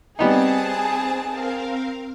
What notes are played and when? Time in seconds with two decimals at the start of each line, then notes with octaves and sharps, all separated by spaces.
0.19 G3 B3 C4 D#4 G#4 A5
1.28 C4 A#4 F5